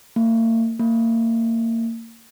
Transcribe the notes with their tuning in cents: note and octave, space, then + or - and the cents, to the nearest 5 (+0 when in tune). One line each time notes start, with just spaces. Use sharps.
A#3 -45
A#3 -30